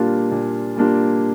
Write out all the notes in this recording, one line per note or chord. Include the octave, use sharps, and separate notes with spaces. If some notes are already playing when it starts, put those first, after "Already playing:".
Already playing: A#2 G3 A#3 D4 F4
A#2
G3 A#3 D4 F4